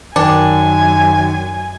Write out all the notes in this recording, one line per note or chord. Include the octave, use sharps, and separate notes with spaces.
F#2 D#3 D4 G#5